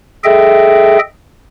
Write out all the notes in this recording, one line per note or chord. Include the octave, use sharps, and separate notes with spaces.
G#4 A4 D#5 E5 G5